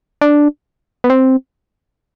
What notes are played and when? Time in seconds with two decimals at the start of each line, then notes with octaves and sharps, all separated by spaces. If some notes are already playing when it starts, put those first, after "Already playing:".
0.21 D4
1.04 B3
1.10 C4